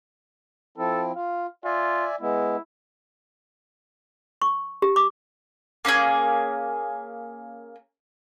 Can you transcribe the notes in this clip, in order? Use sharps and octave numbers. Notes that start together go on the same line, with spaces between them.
F3 C4 E4 A4
F4 F5
F4 D5 E5 G#5
G#3 B3 E4
C#6
G4
D6
A#3 C#4 G4 G#4